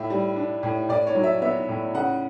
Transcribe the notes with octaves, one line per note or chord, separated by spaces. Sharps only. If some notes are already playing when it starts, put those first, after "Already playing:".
Already playing: A2 E5
G3
D4
A2
A2 D5
C#5
F#3
E5
B3 E5
A2
C#3 F#5